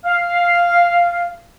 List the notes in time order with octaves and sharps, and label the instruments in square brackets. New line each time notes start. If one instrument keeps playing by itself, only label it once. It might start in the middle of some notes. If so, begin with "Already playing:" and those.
[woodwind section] F5